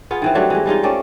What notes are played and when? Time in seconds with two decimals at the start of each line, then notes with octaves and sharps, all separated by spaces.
0.11 B3 F4 G#4
0.22 D#3 E3 C4
0.35 F#3 G3 A3 D4
0.50 E3 G#3
0.66 G3 G#3 D#4 F4
0.83 A3 C4 C#4 D5